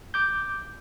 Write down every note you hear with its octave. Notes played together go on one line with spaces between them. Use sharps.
D6 G6